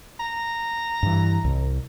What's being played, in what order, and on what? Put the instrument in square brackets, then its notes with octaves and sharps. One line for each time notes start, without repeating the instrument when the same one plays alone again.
[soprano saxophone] A#5
[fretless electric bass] G2 E3
C2